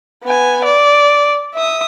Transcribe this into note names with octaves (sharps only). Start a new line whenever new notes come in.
B3 G#5
D5
E5 D#6